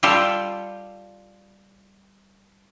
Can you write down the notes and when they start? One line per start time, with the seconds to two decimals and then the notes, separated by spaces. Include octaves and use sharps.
0.03 G3 F4 G4 A4